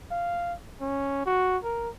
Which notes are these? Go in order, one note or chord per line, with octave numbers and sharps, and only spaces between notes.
F5
C#4
F#4
A#4